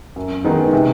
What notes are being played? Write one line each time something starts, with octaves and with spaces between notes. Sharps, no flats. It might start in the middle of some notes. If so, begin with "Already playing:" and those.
F#2
D#3 G#3 B3 D#4
C3